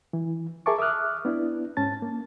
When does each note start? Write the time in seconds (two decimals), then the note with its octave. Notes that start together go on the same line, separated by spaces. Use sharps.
0.13 E3
0.66 G#4 A#4 E5 A5 C#6 D6
0.78 E5 D6 D#6 F6 F#6
1.25 B3 D4 E4
1.77 G#2 C#4 A5 A6
2.02 A#3